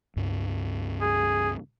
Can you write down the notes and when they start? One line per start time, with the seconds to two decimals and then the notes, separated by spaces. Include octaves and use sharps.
0.16 C#2 G2 G3
1.01 G#4